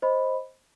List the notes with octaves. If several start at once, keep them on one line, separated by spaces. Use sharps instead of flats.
C5 D#5 B5